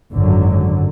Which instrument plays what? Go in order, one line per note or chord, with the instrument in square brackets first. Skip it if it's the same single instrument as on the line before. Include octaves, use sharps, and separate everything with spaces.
[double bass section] G#1 F#2 D3 F#3